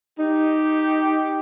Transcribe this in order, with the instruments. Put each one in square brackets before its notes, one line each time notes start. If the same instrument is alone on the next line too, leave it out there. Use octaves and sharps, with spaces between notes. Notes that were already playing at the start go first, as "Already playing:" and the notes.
[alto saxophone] D#4 [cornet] G4